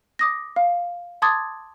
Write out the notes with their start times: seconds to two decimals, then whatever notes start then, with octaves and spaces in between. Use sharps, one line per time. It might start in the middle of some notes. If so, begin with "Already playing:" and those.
0.19 D6 D#6 A#6
0.56 F5
1.22 A5 C6 D6 D#6 G#6 A6